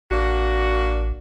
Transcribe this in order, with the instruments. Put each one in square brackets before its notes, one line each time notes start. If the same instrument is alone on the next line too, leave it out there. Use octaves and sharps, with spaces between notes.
[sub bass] A1 [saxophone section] A#3 D4 F#4